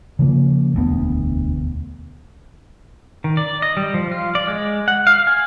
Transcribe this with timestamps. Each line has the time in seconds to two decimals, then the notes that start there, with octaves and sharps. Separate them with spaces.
0.19 C#3 F3 A#3
0.74 E1 D2 B3
3.24 D#3
3.37 D5
3.62 D#5
3.77 G3
3.94 F3
4.12 F4
4.35 D5
4.47 G#3
4.88 F#5
5.07 F5
5.27 G#5